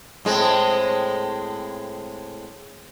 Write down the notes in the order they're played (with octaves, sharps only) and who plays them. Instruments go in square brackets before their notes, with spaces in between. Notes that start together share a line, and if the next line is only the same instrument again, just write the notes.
[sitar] A2 G#3 C4